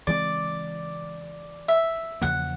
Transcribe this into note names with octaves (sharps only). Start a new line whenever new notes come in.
C#3 E3 G#3 C4 D5
E5
E2 C#3 F3 A#3 F#5